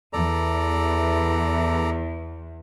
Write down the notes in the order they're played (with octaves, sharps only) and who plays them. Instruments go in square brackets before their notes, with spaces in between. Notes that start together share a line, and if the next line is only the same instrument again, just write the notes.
[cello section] E2 [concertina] A4 D5 A#5